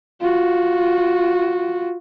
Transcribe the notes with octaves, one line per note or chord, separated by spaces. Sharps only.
F4 F#4